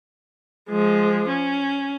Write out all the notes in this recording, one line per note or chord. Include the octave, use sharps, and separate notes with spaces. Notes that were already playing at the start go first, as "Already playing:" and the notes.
F3 G#3
C#4